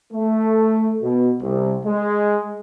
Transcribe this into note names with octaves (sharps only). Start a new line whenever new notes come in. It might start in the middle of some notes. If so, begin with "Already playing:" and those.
A3
B2
C2
G#3